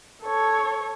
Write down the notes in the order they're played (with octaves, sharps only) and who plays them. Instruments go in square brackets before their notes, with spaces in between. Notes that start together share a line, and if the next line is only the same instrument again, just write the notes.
[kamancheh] A4 C#5